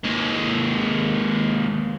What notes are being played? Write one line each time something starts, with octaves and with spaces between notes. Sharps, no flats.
D#2 G#3